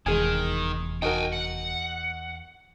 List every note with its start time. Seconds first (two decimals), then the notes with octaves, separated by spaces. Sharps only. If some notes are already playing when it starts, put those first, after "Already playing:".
0.06 F1 E2 D#3 G#3 G#4 G#5
1.02 D#4 F#4 A#4 G5 G#5
1.32 F#5